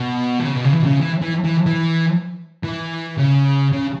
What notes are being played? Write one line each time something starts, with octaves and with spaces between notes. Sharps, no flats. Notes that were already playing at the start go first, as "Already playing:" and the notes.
Already playing: B2
E3
C#3
B2
C#3
E3
B2
C#3
E3
E3
E3
E3
E3
C#3
C#3